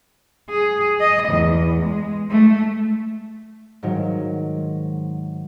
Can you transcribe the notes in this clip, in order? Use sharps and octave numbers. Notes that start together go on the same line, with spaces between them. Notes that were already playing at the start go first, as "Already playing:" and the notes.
G#4
D#5
E2
G#3
A3
G#2 D#3 F#3